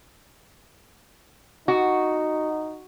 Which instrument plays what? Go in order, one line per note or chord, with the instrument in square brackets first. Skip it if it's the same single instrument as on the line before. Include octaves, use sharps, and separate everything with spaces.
[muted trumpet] D#4 [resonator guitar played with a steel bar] F#4